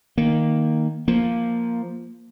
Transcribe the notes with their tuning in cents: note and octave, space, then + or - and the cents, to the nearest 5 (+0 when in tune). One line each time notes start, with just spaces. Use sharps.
D#3 +0 A#3 +0
F3 +0 A#3 +0